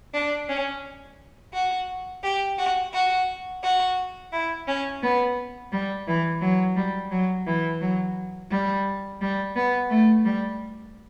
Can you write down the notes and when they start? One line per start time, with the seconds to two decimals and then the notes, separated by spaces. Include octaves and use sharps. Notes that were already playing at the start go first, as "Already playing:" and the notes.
0.14 D4
0.49 C#4
1.53 F#4
2.23 G4
2.58 F#4
2.93 F#4
3.62 F#4
4.32 E4
4.67 C#4
5.02 B3
5.71 G3
6.06 E3
6.41 F#3
6.76 G3
7.11 F#3
7.46 E3
7.81 F#3
8.50 G3
9.20 G3
9.55 B3
9.90 A3
10.24 G3